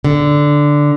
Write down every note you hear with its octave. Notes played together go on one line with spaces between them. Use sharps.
D3